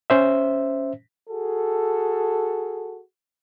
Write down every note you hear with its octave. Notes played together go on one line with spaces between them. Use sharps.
C#4 C5 E5
F#4 G#4 A4